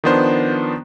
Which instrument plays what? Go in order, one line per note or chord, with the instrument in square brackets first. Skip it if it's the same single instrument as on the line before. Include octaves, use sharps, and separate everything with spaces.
[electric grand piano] D#3 F3 B3 D4 C5